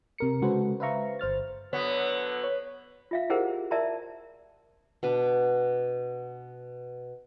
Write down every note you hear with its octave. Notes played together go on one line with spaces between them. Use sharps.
C3 A#4 C#7
C#3 G#3 F#4 A4 B4 C5
B4 C5 E5 F5 A#5 C#6
G1 C5 F6 A6
D3 F#3 B3 C#5
C#5
F4 E5 F5
E4 G4 G#4 A#4 C5 F#5
A#4 D5 E5 A5 A#5 C6
B2 D4 B4